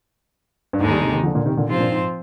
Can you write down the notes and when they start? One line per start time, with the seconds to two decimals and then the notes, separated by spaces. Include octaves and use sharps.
0.73 G2
0.80 D#2 G#2 D3 G#3 D#4
0.90 D#3 G3
1.02 C3 D#3
1.12 C3 D#3
1.23 D3 F3
1.35 A#2 D3
1.46 C3 D#3
1.57 A#2 D3
1.68 G#2 C3 F3 C4 F4 C5
1.79 G2 A#2
1.91 G#2